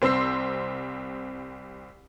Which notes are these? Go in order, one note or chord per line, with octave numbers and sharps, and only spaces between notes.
C2 C4 C6 E6 C7